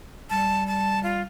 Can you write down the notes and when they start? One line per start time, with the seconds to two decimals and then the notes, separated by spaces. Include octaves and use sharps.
0.30 G3 A5
0.67 A5
1.03 F4